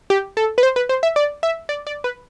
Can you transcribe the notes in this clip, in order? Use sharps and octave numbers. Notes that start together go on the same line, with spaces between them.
G4
A4
B4
C5
B4
C5
E5
D5
E5
D5
D5
B4